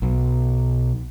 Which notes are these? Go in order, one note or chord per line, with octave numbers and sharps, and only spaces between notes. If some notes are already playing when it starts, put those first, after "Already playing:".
B1